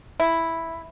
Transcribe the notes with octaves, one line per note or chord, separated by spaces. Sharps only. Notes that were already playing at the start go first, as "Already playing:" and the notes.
E4